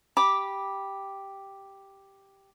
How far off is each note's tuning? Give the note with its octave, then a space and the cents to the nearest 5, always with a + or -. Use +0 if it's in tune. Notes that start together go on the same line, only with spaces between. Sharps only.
G4 +0 B5 -20 D6 +0